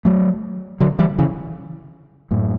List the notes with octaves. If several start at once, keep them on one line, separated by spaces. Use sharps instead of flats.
F#3 A3
D3 F#3
E3 G3
C#3 E3
F#2 A2